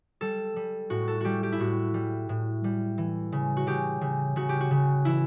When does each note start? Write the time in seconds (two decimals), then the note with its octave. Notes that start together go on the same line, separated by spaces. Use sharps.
0.21 G3 A4
0.56 G3
0.90 A2 F#4
1.08 A4
1.21 G3 F#4 G4
1.43 G4
1.52 E4
1.60 A2 F#4
1.94 G3
2.29 A2
2.64 G3
2.98 E3
3.32 C#3
3.57 F#4
3.67 C#3 G4
4.01 C#3
4.36 C#3 F#4
4.49 G4
4.60 F#4
4.71 C#3
5.05 E3 E4